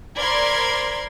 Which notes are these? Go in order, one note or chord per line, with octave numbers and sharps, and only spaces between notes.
A#4 C5 D5 B5 C6 G#6